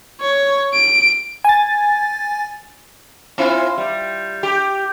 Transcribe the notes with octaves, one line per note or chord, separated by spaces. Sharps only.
C#5
D7
G#5 A6
C4 E4 F4
G3
G4